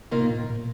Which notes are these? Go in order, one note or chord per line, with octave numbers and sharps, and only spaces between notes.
C3 D#3 A#3 F4
A#2
A#2